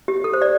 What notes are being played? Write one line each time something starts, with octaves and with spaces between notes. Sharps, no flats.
G4
A4
C5
D5